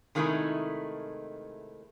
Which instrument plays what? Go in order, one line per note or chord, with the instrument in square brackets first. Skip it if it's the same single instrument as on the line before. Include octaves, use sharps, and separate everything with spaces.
[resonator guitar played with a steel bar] C3 D#3 G#3 A3 D#4 E4